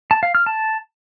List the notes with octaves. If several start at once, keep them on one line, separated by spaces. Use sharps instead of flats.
A5
F5
F6
A5